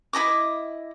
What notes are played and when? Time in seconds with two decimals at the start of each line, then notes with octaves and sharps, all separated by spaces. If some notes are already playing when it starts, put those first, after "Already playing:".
0.13 E4 A4 D#5 D6